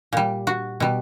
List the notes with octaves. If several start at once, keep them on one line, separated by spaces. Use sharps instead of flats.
A#2 G3
F#4
B2 G3